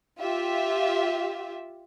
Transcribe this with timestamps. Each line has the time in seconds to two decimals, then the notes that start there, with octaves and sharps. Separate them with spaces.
0.20 F4 G4 E5